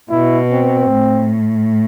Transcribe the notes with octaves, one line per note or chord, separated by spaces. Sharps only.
B2 E4
C4
A2